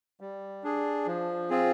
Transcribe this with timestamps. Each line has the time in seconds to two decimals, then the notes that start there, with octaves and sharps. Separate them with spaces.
0.21 G3
0.64 D4 G#4
1.07 F3
1.50 C4 F4 G#4